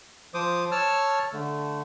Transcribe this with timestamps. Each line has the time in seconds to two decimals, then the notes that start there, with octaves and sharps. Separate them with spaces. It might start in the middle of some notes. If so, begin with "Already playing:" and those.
0.34 F3 C5 D6 D#6
0.72 C#5 A5 E6 F6
1.33 D3 A3